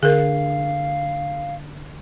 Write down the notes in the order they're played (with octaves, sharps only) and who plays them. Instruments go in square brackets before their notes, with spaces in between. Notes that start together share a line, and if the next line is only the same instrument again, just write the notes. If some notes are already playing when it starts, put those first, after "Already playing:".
[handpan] D3 [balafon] G#4 A#4 [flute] F5